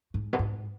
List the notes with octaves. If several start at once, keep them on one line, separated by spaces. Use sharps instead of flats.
G#2
B2
G#2